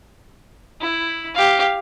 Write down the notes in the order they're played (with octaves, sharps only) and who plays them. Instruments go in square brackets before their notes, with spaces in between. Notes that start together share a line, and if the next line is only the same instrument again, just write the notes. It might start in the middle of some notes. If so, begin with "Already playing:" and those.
[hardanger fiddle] E4
G4 F5